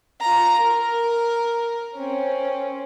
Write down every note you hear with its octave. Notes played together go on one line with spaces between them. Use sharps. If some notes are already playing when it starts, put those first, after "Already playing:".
F4 A#5
A#4
C4 C#4